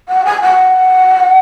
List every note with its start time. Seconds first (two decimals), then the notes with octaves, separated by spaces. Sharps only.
0.09 F#5
0.25 G#5
0.42 F#5